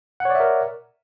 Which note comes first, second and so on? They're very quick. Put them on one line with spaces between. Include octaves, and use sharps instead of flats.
F#5 C#5 D5 E5 A#4